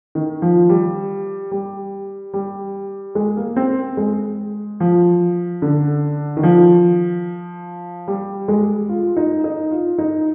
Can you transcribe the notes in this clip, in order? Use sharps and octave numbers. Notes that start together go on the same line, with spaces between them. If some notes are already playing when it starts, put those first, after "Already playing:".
D#3
F3
G3
G3
G3
G#3
A#3
C4
G#3
F3
D3
D#3
F3
G3
G#3
F4
D#4
D#4
F4
D#4